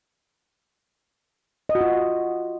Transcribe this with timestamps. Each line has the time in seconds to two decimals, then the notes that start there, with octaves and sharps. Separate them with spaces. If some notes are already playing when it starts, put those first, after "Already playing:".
1.69 D#5
1.75 F#4
1.81 F4